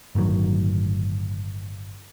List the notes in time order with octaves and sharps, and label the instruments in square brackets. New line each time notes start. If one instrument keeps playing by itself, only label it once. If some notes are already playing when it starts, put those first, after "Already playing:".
[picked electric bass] G1 A2 D#3 F#3